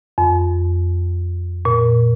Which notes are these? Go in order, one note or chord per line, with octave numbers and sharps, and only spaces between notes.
F2
A#2